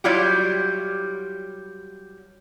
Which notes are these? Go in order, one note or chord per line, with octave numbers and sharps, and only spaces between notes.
F#3 G3 E4 F4 G4